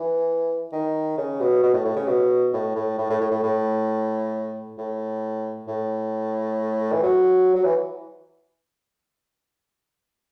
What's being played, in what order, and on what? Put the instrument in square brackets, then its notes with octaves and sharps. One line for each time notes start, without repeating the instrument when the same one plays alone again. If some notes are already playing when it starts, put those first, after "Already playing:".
Already playing: [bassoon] E3
D#3
C#3
B2
B2
A2
A2
C#3
B2
A2
A2
A2
A2
A2
A2
A2
A2
A2
E3
F#3
F#3
E3